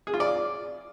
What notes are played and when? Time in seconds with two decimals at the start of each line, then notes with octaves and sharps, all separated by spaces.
0.07 G#4
0.14 F4
0.20 D5